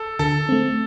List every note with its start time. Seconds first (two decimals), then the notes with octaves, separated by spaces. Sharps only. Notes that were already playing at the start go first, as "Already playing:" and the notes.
Already playing: A4
0.19 D3 A4
0.49 A3 C4